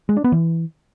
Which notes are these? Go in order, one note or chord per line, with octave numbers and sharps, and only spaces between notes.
G#3
D4
B3
E3